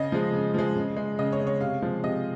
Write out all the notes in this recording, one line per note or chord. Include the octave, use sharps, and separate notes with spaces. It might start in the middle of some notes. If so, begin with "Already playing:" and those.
Already playing: C#3 D#5
F3 G#3
C#3
F3 G#3
C#3
G#3
C#3 D#5
C#5
G#3
C#5
C3 F5
F3 G#3
C3 D#5